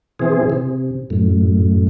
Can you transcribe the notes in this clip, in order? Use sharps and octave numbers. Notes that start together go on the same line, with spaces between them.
B2 E3 C4 G#4
C3
F#2 A2